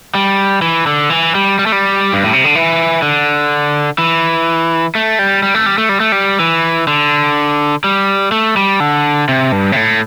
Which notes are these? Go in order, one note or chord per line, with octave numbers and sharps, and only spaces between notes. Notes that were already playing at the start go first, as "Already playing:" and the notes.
G3
E3
D3
E3
G3
G3
A3
G3
G2
A2
C3
D3
E3
D3
E3
A3
G3
G3
A3
G3
A3
G3
A3
G3
E3
D3
G3
A3
G3
D3
C3
G2
C3
A2